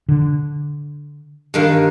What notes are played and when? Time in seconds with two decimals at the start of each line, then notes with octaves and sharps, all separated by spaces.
0.09 D3
1.54 G2 D#3 A#3